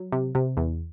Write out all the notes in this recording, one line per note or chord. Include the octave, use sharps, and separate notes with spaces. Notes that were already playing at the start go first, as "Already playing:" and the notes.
Already playing: F#3
C3
C3
E2